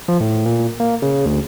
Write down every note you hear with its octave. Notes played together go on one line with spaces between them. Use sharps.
F3
A2
A#2
A#3
C#3
D2